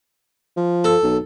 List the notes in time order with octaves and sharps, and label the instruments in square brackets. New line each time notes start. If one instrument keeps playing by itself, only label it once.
[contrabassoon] F3
[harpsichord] A4
[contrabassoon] B1